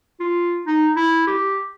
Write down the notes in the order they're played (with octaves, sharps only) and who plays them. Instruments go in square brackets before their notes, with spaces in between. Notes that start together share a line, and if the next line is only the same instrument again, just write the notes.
[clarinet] F4
D#4
E4
G4